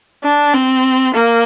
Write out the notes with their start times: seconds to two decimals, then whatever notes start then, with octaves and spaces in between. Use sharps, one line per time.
0.24 D4
0.54 C4
1.14 A#3